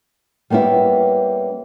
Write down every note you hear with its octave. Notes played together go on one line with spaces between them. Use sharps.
G3 A#3 B3 C#4 E4